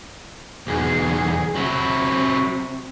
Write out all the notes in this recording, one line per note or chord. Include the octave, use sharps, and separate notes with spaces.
B1 E2 G#4
C3 F#3 C4 E4